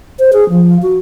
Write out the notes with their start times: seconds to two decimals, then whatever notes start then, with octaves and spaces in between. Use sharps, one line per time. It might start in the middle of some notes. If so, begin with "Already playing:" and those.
0.19 C5
0.33 G#4
0.50 F3
0.82 F#4